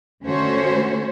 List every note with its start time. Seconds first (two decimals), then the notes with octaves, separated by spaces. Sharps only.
0.25 D3 A3 C#4 F#4 C5 C#5